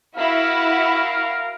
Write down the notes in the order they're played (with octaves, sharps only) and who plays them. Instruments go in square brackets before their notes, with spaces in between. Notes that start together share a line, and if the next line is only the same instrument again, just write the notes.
[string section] E4 F#4 [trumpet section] A#4 F5